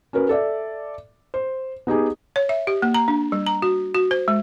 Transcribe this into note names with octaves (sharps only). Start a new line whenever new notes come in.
C#4 F#4 A#4 B4
A4 D5 E5
C5
B3 D#4 G4 G#4
C#5
E5
G4
A#3
A#5
D4
G3
A#5
F#4
F#4
C5
G#3